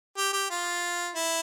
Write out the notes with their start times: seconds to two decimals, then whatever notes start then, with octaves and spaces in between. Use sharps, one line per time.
0.17 G4
0.33 G4
0.50 F4
1.15 E4